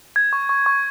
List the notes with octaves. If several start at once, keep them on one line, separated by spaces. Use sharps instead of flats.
G#6
C#6
C#6
C#6